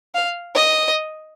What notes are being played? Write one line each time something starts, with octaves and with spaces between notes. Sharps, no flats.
F5
D#5